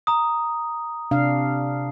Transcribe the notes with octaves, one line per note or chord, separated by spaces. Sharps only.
A#5 D#6
C3 D4 F5